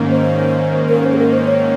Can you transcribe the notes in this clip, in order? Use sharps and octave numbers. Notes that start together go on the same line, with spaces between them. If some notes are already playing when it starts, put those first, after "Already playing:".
Already playing: G#2 D#3 A#3 C#4
C5
A#4
C5
G#4
A#4
C5
C#5